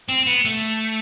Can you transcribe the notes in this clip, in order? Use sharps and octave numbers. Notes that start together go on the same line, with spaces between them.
C4
B3
A3